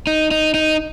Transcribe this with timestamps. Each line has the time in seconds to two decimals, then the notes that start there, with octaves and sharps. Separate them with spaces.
0.07 D#4
0.31 D#4
0.54 D#4